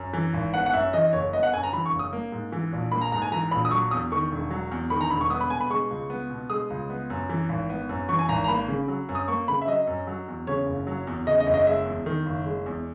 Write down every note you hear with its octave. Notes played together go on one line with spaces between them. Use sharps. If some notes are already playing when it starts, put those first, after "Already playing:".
Already playing: F#2
E3
G#1
B3 F#5
F#5
F#2 E5
E3 D#5
F#1 C#5
B3 D#5
F#5
F#2 G#5
A#5
E3 B5
C#6
F#1
D#6
A#3
G#2
E3
A#1
A#3 B5
A#5
G#2 A#5
G#5
E3 A#5
A#1 B5
D#6
F#3 C#6
E2 D#6
D#3 C#6
E1
F#3
E2
D#3 B5
A#5
E1 B5
C#6
B3 D#6
B5
B2 G#5
B5
G#3 C#6
C#2
B3
B2
G#3 D#6
C#2
B3
F#2
E3
G#1
B3
F#2
E3 C#6
G#5
G#1 A#5
A#5
A#3 B5
C#3
F#3
F#2
D#6
A#3 C#6
C#3 B5
E5
F#3 D#5
F#2
F#3
E2
C#3 C#5
F#1
F#3
E2
C#3 D#5
D#5
F#1
D#5
G#3 E5
E2
D#3
F#1
G#3
E2